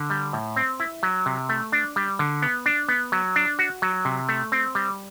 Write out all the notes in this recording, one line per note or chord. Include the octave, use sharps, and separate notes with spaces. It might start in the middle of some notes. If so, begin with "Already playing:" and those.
Already playing: D3
G3
A2
C4
E4
F#3
C3
A3
D4
G3
D3
B3
D4
B3
F#3
D4
F#4
F#3
C3
A3
C4
G3